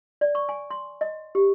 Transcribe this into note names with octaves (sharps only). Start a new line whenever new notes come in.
D5
C#6
G#5
C6
D#5
G4